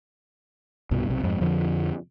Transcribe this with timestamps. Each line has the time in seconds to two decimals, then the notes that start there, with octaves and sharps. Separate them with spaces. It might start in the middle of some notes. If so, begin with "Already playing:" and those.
0.91 C2 G2 B2
1.09 B1 C3
1.23 F2 G#2
1.41 F2 D3 F3